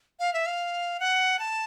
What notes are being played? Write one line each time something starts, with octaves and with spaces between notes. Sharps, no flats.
F5
E5
F5
F#5
A5